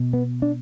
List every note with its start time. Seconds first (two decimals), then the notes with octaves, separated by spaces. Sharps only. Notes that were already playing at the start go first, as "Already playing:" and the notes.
Already playing: B2
0.13 B3
0.42 D4